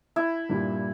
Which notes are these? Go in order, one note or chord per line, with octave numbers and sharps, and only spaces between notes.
E4
G2 A#2 G3